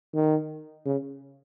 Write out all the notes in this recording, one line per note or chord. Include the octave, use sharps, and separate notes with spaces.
D#3
C#3